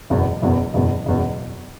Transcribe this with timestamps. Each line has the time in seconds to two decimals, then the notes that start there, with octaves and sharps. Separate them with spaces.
0.10 F#1 E2 B2
0.42 F#1 E2 B2
0.74 F#1 E2 B2
1.06 F#1 E2 B2